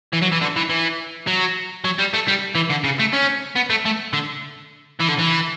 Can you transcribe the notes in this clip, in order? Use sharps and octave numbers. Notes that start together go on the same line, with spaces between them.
E3
F#3
E3
D3
E3
E3
F#3
F#3
G3
A3
G3
E3
D3
C#3
A3
C#4
B3
A3
A3
D3
E3
D3
E3